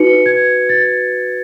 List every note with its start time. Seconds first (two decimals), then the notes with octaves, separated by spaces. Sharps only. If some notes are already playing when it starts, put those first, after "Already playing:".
Already playing: D#4 F#4 B4 C#7
0.26 G#6
0.69 A6